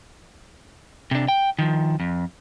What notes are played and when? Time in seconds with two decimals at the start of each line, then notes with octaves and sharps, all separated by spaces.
1.11 C3 D4
1.28 G5
1.59 D#3 F3
2.00 F2